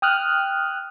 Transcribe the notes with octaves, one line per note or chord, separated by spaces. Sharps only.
G5 D#6 F6 F#6